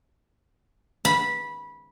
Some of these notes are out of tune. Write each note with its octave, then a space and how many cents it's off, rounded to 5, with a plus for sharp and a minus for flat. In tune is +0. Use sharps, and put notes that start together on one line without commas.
B5 -15